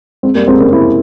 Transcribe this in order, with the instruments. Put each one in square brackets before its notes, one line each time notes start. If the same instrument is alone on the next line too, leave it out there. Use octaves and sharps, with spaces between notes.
[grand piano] G#3 C4
G3 A#3
G#3 C4
A#3 C#4
C4 E4